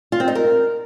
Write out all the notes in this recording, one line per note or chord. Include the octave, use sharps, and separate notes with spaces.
F4
C4
D#4
A#4